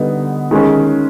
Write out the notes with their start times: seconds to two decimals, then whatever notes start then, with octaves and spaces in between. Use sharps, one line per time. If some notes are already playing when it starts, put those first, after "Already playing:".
Already playing: D3 G3 B3 D#4
0.51 D#3 G#3 C#4